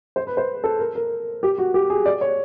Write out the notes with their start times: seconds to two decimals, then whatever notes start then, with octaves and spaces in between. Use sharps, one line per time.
0.16 C5
0.27 B4
0.37 C5
0.64 A4
0.79 A#4
0.95 A#4
1.43 G4
1.58 F#4
1.74 G4
1.90 G#4
2.06 D5
2.21 C#5